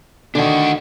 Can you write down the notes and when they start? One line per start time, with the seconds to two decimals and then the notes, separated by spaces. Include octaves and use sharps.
0.35 D3 D#3 D4 F#4